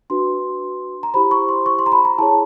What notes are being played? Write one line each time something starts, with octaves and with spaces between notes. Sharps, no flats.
D4 F#4 B4 C6
A#5
E4 G4 C5 B5
C#6
C6
C#6
C6
A#5
B5
A#5
E4 G#4 C#5 A5